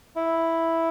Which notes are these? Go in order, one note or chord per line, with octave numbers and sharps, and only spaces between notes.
E4